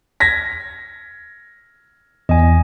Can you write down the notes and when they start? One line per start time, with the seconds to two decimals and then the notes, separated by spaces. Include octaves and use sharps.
0.20 G#6 A#6 B6
2.29 E2 D#5 G#5